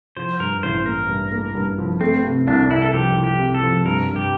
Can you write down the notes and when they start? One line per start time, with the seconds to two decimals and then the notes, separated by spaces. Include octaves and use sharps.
0.17 F3 C5
0.40 G2 A#4
0.63 A1 C5
0.85 A#3 A#4
1.08 G2
1.32 A#3
1.55 G2
1.78 F3
2.01 A3 C4
2.24 C3
2.47 C2 D4
2.70 C2 E4
2.82 A4
2.93 F3 G4
3.17 F3
3.24 G4
3.39 C3
3.55 A4
3.62 F3
3.85 G2 A#4
4.09 G2
4.16 G4